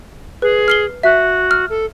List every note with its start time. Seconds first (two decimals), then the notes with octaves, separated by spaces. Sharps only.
0.42 G#4 B4
0.68 F6 C7 G7
1.03 F#4 E5
1.51 F6
1.69 A4